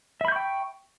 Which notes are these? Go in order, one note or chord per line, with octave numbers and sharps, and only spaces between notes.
E5 G5 B5 C#6 G6